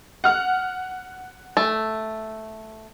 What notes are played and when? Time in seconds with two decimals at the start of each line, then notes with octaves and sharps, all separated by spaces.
0.24 F#5 F6
1.57 A3